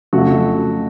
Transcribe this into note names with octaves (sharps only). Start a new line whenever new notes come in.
F2 C#3 F#3 A3 F#4